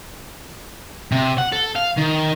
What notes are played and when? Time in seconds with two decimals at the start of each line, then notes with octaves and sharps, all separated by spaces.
1.12 C3
1.38 F#5
1.52 A4
1.75 F5
1.97 D#3